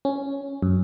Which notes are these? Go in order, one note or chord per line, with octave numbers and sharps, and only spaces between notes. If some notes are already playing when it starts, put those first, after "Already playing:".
C#4
F#2